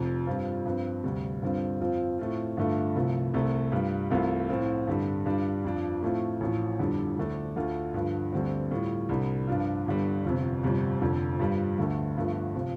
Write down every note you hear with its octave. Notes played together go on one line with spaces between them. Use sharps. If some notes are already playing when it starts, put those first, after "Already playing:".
Already playing: F1 F2 C3
G2 G3 C4 F4
G2 F3 C4
D2 C3 G3
G2 D3 G3 C4 F4
F2 F3 C4 F4
A2 A3 C4 F4
G2 D3 A3 F4
C2 C3 F3 A3
C2 C3 A3
G2 G3 F4
C2 C3 A3 F4
A2 F3 C4 F4
G2 D3 G3
G2 G3 D4 F4
F2 F3 D4
A2 F3 A3 C4 F4
A1 A2 F3
G1 F2 D3 G3 D4
D2 D3 A3 D4
D2 D3 A3 F4
G2 D3 F3
D2 D3 G3 C4
A2 G3 F4
C2 C3 G3 D4
G2 F3 D4 F4
G1 G2 D3 G3
G1 F2 C3
G1 F2 C3 G3
F1 F2 D3
G2 G3 F4
D2 D3 A3
G1 G2 F3 A3
C3 F3